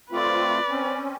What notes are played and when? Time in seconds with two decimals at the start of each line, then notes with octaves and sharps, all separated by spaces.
0.12 A3 C4 F4 B4 D5
0.69 C4 C#4